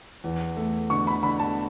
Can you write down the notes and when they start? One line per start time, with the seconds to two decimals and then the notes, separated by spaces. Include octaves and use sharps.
0.24 E2
0.57 A3
0.90 D3 C#6
1.07 B5
1.23 D3 B5
1.39 A5